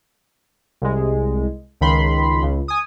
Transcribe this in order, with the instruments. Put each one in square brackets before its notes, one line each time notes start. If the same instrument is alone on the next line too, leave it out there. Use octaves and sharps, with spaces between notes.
[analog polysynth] C2 G#3
C#2 D#3 B5 C6
C#2
G#5 D#6